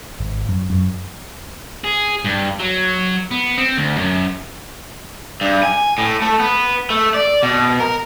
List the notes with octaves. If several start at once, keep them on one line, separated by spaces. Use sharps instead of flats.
G#1
F#2
F#2
G#4
G2
F#3
B3
C4
D2
F#2
G2
G#5
A2
A3
B3
A3
D5
B2
A#4